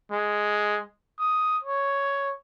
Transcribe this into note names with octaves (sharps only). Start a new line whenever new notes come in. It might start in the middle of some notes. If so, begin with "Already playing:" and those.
G#3
D#6
C#5